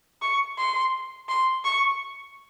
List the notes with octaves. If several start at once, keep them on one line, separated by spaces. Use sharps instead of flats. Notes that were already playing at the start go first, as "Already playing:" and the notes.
C#6
C6
C6
C#6